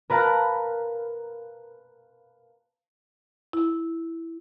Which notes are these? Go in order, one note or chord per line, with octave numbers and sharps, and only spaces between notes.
A#4 B4 F5 A5 A#5 F#6
E4